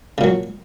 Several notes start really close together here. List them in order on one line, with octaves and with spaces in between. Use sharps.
C#3 A#2 F#3